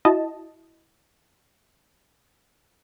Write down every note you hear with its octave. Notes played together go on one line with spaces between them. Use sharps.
E4 F#4 D#5 A5